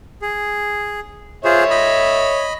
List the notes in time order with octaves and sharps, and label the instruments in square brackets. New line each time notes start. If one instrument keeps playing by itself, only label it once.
[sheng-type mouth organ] G#4
[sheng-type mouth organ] F4 G#4 C5 [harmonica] C#5 E5
[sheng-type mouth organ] D#5 B5